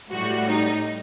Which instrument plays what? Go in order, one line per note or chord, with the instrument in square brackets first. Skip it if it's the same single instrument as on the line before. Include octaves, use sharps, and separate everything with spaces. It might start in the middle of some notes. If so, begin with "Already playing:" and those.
[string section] A2 G3 F#4
D#4